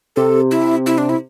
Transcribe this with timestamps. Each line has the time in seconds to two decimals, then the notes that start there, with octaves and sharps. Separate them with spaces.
0.16 C3 A4
0.51 E4
0.86 E4
0.98 D4
1.09 E4